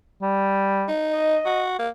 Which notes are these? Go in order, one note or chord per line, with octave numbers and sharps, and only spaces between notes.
G3
D#4
D#5
F#4
A#3